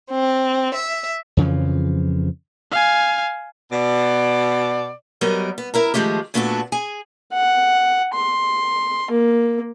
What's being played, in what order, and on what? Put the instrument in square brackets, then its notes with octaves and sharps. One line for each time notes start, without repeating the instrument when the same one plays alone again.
[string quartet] C4
E5
[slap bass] F2 C#3 E3 F3
[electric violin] F5 G#5
[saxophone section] B2 D5
[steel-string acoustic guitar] F#3 G3 B3 A#4 D#5
B3
E4 A#4 A#5
D#3 F3 G#3 A3 G4
A#2 A3 B3 D4 F#4 A4
G#4 G#5
[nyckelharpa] F#5
C6
A#3